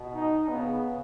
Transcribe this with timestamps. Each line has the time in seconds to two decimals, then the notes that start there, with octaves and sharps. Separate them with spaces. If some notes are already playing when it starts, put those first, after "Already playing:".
Already playing: B2
0.15 D#4
0.49 C#3 B3
0.84 C#3